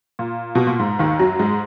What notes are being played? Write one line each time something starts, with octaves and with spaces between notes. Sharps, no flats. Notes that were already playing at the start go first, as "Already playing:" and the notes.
A#2
B2
A#2
G#2
D#2 D#3
F#2 F#3
G#2 G#3